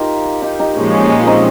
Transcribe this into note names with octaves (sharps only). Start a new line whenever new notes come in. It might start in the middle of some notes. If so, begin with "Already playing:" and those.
Already playing: D#4 F4 G4 A#4
D#4 G4
D#4 G4
A#2 F3 G#3 C#4
F4
C4 D#4